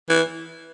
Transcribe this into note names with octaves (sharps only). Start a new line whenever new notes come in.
E3